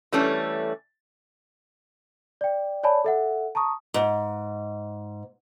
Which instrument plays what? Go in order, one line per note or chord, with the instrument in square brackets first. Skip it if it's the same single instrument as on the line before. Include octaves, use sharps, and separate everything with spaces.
[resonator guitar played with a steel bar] E3 G3 A3 C#4 D4
[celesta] D5 G5
C#5 D5 G#5 A5 B5
A4 E5 F#5
A5 A#5 C#6 D#6
[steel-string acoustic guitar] G#2